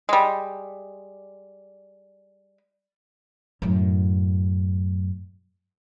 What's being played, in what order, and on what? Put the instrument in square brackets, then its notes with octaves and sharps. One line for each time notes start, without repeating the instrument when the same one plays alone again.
[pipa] G3 G#3
[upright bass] F#2 A2